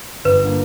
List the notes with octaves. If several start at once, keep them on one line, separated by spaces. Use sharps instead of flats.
G1 B4
D3 A#3